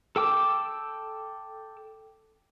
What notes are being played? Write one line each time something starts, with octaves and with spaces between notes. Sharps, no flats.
A4 G5 D6 E6